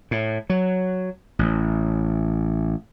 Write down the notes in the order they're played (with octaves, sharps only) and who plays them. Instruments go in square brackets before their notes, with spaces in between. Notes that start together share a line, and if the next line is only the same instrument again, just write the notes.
[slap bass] A2
F#3
A1